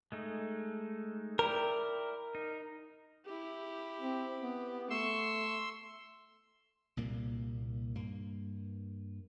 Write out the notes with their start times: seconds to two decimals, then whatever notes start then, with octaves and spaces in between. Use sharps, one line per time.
0.12 G#3 A3 D#4
1.39 E4 A#4 D5 G5
2.35 D#4
3.25 E4 G4
4.00 C4
4.40 B3
4.90 A3 C6 C#6 E6
6.97 C2 A#2 A#3
7.95 G2 A#3